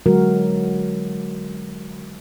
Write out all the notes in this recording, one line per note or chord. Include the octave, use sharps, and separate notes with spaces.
D3 F#3 G#3 F#4 A#4